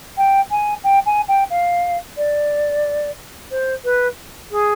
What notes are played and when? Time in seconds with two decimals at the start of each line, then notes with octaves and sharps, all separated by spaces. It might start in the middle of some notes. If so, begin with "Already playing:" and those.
0.17 G5
0.51 G#5
0.84 G5
1.06 G#5
1.28 G5
1.50 F5
2.17 D5
3.51 C5
3.84 B4
4.51 G#4